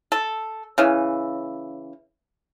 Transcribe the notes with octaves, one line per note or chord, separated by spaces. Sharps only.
A4
C#3 E3